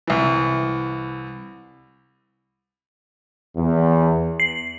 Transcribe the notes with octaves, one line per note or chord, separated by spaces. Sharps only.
C2 E3
E2
C7